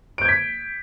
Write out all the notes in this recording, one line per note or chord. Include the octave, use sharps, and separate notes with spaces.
G6 G#6 B6 D7